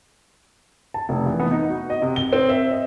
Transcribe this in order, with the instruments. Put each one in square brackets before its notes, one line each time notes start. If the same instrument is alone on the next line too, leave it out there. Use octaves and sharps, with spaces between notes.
[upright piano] A5
F1
E3
B3
D#4
F#4
D#5
C3
G7
C4
E5
D#5